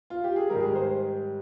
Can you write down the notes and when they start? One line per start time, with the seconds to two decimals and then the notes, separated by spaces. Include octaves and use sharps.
0.10 F4
0.24 G4
0.36 G#4
0.50 G#2 D#3 G3 A#4
0.61 G#4
0.68 A#4
0.75 C5